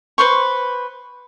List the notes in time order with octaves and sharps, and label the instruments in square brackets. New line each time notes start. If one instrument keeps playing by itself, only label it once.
[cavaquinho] B4 C5 C6 C#6